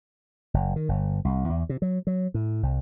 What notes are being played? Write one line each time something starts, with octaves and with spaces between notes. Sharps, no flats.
F#1
D#3
G1
C2
E2
C3
F#3
F#3
A2
C2